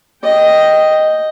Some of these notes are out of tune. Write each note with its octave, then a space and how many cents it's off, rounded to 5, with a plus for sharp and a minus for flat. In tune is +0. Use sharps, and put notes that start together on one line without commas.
D#5 +0 G5 +0